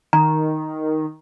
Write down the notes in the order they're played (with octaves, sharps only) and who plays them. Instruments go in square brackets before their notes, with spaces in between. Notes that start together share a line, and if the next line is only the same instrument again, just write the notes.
[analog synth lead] D#3 [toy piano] A#5